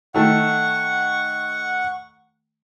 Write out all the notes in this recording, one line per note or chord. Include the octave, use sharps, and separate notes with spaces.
D#3 A3 F#5 C#6